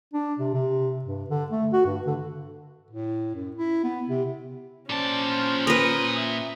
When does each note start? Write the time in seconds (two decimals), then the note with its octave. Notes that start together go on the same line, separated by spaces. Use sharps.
0.14 D4
0.39 C3
0.54 C3
1.04 G2
1.30 D3
1.50 A3
1.73 F#4
1.86 G2
2.07 D3
2.91 A2
3.34 F#2
3.56 E4
3.83 B3
4.09 C3
4.90 A#2 C#4 C5 D5 A5
5.30 F4
5.67 A#4 B4 D#6
6.17 E5